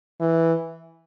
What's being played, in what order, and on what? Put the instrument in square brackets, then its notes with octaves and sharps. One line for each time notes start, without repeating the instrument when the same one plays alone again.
[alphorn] E3